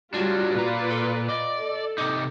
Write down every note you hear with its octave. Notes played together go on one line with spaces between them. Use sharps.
F#3 G3 D4 F4 F#4
A#2 F4 B4 D5 A#5
A4
D5 D#5
A4
C3 D#4 D6